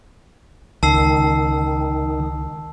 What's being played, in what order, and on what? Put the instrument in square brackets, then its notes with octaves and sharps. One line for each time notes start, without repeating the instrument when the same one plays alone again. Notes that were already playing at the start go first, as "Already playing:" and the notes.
[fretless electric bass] C#2 [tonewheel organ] D#3 [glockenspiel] A5 E6 C7